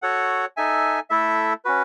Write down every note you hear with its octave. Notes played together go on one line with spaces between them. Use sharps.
F#4 A4 C#5 F#5
D#4 A4 E5 G#5
A3 E4 A4 E5
C#4 F#4 B4